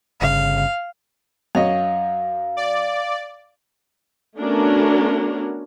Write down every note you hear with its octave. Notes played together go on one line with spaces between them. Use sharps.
G1 C#3 F5
F#2 C#5 D#5 F5
D5
A3 B3 C#4 D4 F#4 A#4